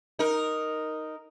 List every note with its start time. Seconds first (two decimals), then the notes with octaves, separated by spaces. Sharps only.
0.19 D#4 A#4